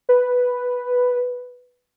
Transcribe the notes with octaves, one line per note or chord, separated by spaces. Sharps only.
B4